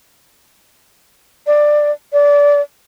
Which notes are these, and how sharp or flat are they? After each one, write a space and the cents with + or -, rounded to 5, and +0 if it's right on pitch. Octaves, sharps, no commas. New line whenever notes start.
D5 +10
D5 -20